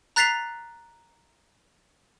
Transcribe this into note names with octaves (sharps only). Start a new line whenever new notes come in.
A#5 F#6 A6 B6 C7 F7